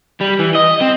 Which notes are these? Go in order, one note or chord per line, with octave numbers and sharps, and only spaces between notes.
G3
E3
D#5
C4